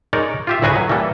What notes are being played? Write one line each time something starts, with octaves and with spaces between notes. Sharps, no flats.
G#3 D#4 A#4 C#5 D5
F4 G4 E5
D2 A2 F#4 G#4 B4 G#5
F#3
E3 G3 A#3 A4